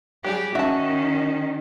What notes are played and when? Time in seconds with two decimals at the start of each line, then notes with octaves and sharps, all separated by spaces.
0.24 F#3 G3 G4 G#4
0.55 D#3 C#4 F#4 E5 A5